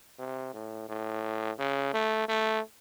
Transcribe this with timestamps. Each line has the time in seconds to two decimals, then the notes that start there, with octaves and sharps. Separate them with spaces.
0.19 C3
0.54 A2
0.89 A2
1.59 C#3
1.94 A3
2.28 A3